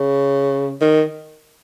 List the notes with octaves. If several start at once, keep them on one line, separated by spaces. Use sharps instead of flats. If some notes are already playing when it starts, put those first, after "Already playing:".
Already playing: C#3
D#3